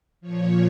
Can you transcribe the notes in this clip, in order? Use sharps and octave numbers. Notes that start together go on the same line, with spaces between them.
A#2 F3 C#5